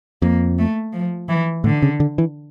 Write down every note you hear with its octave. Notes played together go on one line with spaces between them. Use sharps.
F2 A#3
A3
F3
E3
A2 D3
C#3
D3
E3